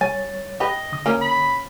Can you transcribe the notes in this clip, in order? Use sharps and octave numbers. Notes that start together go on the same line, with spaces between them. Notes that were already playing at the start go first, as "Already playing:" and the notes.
G3 C#5 G#5 A6
G4 B4 D#5
D3 D#6
A#3 C#4 A#4
B5